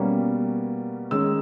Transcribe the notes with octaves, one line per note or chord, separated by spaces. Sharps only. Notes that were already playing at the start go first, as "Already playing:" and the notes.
Already playing: B2 G3 A#3 C#4
D#3 G#3 C#4 E6